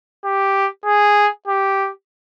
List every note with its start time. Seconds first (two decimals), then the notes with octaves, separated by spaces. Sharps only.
0.24 G4
0.86 G#4
1.48 G4